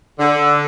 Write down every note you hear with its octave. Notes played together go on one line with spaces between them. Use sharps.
D3